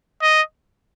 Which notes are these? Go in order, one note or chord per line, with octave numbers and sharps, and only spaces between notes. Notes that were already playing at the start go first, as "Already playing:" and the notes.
D#5